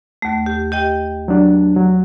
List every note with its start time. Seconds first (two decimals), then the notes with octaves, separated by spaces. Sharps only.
0.22 D#2 A3
0.46 G4
0.72 G4 D#5 G5
1.28 F#3 D4
1.77 F#3